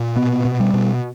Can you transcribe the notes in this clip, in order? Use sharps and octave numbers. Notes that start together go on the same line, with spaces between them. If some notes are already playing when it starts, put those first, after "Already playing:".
Already playing: A#2
B2 B3
B2
G3
B2